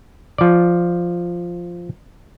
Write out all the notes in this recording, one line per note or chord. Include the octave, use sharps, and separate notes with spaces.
F3 D5